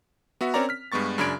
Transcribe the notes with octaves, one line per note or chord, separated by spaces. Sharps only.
B3 F#4 E5
C4 C#4 A#4 C#5 D5 A#5
F6 B6
G2 G#3 B3 C#6 A6
F#2 C#3 D4 B5 G#6 D7